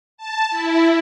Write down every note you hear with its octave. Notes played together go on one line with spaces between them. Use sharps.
A5
E4